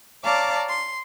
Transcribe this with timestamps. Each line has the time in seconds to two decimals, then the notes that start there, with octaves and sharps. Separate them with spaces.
0.24 C#5 D5 F5 A5 A#5 D6
0.68 C6